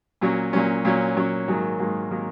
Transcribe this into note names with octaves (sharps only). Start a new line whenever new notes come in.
A#2 F#3 C#4
A#2 F#3 C#4
A#2 F#3 C#4
A#2 F#3 C#4
G#2 D#3 F#3 A#3
G#2 D#3 F#3 A#3
D#3 F#3 A#3